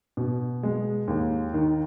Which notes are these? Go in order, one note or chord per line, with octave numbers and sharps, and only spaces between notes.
B2
G#3
D#2
D#3